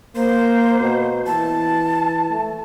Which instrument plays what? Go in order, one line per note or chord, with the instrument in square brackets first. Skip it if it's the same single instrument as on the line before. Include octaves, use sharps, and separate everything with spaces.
[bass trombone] A#3 [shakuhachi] C5
[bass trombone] B2
[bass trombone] E3 [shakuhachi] A5
[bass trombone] A3